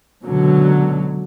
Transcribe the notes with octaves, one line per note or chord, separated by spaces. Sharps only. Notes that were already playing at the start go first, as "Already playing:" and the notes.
C#2 B2 D3 F#3